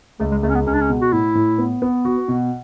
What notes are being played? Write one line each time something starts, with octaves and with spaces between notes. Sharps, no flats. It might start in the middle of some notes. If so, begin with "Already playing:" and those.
C#2 A3
G#3
C#2 A3
C#4
B3
C#2 C#4
D4
C#4
B2
F#4
A2 E4
A2
B3
B3
F#4
B2